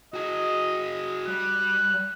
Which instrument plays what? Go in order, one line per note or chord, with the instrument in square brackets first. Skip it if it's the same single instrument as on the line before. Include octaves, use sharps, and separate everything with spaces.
[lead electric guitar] F#4 G#4 [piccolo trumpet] D#5
[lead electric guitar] G3 [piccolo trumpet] F#6